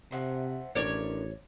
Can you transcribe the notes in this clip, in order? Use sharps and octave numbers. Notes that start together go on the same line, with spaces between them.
C3 C5 E5 F#5
A1 D4 E4 A#4 C#5 D5